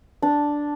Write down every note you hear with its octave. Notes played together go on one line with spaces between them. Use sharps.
D4